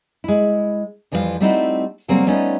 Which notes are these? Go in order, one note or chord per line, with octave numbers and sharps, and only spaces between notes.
G#3 E4
F2 E3 F3 G3 F#4 F5
G3 A3 C4 D#4 E4 F#4
C#3 F#3 G3 A#3 C4
G3 A3 B3 C#4 D#4 F4